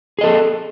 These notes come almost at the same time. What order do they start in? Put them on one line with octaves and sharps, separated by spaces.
G#4 D#5 A4